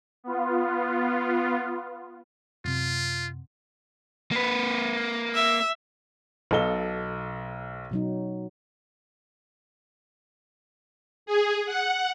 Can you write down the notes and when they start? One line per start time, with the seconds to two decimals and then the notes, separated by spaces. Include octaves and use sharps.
0.24 B3 F4
2.65 F#2 C3 F4
4.31 A#3 B4
5.35 E5
6.51 B1 B2 A4 D#5 F5 G7
7.91 B2 F#3 D#4
11.26 G#4
11.66 F#5